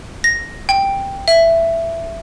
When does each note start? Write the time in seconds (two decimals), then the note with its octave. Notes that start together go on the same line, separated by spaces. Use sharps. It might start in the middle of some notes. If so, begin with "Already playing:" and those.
0.24 A#6
0.69 G5
1.28 E5